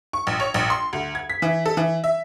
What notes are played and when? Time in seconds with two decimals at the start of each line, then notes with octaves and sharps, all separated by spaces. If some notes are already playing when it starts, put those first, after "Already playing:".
0.13 C#6
0.27 A#1
0.40 C#5
0.54 A#1
0.70 C6
0.93 D2
1.15 G#6
1.30 B6
1.42 E3
1.66 A4
1.77 E3
2.04 E5